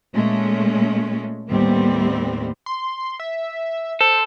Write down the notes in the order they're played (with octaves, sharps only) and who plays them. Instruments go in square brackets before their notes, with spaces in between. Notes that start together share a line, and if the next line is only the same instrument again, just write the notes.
[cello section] A#2 G#3 A3 C#4
D#2 A2 G3 B3 C4
[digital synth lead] C6
E5
[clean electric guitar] A4 [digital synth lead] C5